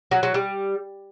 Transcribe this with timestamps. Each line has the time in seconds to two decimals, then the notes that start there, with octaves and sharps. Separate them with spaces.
0.11 F#3
0.23 F#3
0.34 G3